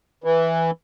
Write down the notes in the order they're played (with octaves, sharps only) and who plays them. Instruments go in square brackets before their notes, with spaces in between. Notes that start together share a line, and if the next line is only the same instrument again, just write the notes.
[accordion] E3